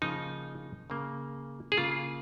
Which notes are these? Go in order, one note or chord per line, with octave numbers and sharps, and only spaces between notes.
C#3 F3 A#3 D#4
C#3 A#3
G#4
C#3 A#3 F4